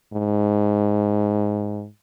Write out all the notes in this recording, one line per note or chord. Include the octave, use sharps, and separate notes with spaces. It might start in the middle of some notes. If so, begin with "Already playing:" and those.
G#2